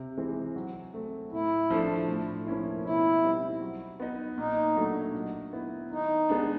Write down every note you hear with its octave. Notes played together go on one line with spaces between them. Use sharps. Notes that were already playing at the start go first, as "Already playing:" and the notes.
Already playing: C3
E3 G#3 C4
F#3
A3 C4
A2 E4
F3 A3 D4
A2
F3 A#3 C#4 E4
B2 E4
G3 C4 D#4
F#3
B3 D#4
A#2 D#4
F#3 A3 D4
F#3
B3 E4
D#3 D#4
G#3 B3 D4